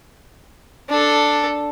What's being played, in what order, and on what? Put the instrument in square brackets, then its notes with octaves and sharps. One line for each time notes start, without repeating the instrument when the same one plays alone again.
[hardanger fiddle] D4 A4